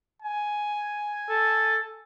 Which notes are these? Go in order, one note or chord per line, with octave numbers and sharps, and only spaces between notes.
G#5
A4